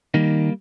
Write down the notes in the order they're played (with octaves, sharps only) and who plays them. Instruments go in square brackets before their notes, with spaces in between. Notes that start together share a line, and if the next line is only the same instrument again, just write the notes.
[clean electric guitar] D#3 G3 A#3 D#4